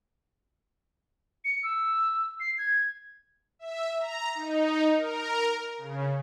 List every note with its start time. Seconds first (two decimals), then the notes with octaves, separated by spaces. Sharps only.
1.45 C#7
1.63 E6
2.40 C7
2.58 G#6
3.59 E5
3.99 A#5
4.35 D#4
4.96 A#4
5.78 C#3